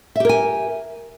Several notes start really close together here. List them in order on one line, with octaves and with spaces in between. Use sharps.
E5 G4 A#4 G#5